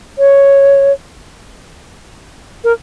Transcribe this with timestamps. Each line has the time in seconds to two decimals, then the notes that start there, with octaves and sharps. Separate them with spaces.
0.18 C#5
2.64 A#4